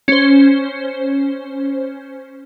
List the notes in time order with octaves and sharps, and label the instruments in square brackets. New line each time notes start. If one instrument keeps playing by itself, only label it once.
[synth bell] C#4 C5